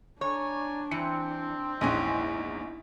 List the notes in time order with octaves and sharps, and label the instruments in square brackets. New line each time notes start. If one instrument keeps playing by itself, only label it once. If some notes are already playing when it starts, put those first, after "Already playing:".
[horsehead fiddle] D4 [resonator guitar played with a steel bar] C#5 [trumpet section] D5 G#5 A#5
[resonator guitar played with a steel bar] E3 [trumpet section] C4 [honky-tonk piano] C#7
[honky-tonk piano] A#1 E2 [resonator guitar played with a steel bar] G#2 C#4 D#5 [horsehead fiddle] D#4 E4